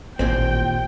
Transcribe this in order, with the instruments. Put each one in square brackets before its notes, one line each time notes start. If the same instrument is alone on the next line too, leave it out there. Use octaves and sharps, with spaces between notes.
[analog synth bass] A1 [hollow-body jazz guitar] D#2 A#2 C4 [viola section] G5